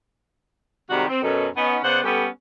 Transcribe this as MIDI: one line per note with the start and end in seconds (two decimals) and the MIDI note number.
0.90 1.08 48
0.90 1.08 51
0.90 1.08 55
0.90 1.08 56
0.90 1.08 60
0.90 1.08 66
1.08 1.22 60
1.22 1.47 42
1.22 1.47 47
1.22 1.47 69
1.57 1.78 59
1.57 1.78 61
1.57 1.78 63
1.83 2.00 49
1.83 2.00 59
1.83 2.00 72
1.83 2.00 74
1.83 2.00 78
2.03 2.27 55
2.03 2.27 59
2.03 2.27 61
2.03 2.27 67
2.03 2.27 69